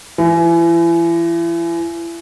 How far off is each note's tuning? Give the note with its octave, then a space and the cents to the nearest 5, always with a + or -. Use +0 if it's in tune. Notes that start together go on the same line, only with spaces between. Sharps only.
E3 +35